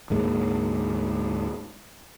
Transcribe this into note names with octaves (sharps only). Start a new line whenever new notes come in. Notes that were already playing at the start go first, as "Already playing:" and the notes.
D2 G#2 G#3 A#3